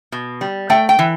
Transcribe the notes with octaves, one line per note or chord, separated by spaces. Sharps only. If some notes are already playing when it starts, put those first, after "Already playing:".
B2
G3
A3 G5
G5
E3